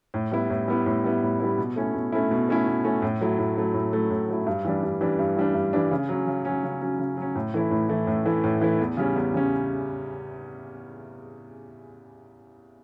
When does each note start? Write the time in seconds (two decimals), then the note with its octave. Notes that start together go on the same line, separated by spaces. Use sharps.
0.14 A2
0.32 G3 B3 E4
0.50 A2
0.68 G3 B3 E4
0.86 A2
1.04 G3 B3 E4
1.22 A2
1.40 G3 B3 E4
1.58 B2
1.76 A3 C#4 E4
1.94 B2
2.12 A3 C#4 E4
2.31 B2
2.49 A3 C#4 E4
2.66 B2
2.84 A3 C#4 E4
3.02 A2
3.21 F#3 A3 E4
3.38 A2
3.57 F#3 A3 E4
3.74 A2
3.93 F#3 A3 E4
4.10 A2
4.29 F#3 A3 E4
4.47 G2
4.65 E3 G3 D4
4.83 G2
5.01 E3 G3 D4
5.19 G2
5.37 E3 G3 D4
5.54 G2
5.73 E3 G3 D4
5.91 C#3
6.09 F#3 C#4
6.27 C#3
6.45 F#3 C#4
6.63 C#3
6.81 F#3 C#4
6.99 C#3
7.17 F#3 C#4
7.35 A2
7.54 E3 A3 E4
7.71 A2
7.89 E3 A3 E4
8.07 A2
8.26 E3 A3 E4
8.44 A2
8.61 E3 A3 E4
8.80 E2
8.97 C#3 G3 C#4
9.16 E2
9.34 C#3 G3 C#4